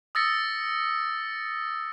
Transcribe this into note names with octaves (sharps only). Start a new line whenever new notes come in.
D#6 E6 A6 A#6 C#7